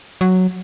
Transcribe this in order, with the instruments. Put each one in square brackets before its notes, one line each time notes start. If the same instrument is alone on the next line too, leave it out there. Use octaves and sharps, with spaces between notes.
[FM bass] F#3